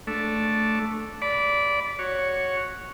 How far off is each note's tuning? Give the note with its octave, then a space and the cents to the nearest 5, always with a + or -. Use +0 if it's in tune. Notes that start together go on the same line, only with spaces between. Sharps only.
A3 +0 D4 +0
D5 -15 B5 +0
F#4 +0 C#5 +0